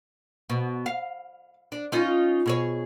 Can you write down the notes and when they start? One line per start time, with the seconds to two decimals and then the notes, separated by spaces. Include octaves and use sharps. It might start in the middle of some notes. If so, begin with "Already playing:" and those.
0.50 B2
0.86 F5
1.72 D4
1.92 C#4 D#4 F4
2.46 B2 G#4 C#5